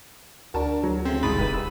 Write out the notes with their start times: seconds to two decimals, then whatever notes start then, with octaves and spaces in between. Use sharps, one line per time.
0.54 D2 D4 F#4 A#4 A5
0.83 F#3
1.05 C#3 A3 C4
1.23 G1 C2 G#2 B5 D#6 A6
1.38 E1 C2 B4 D#7
1.54 E6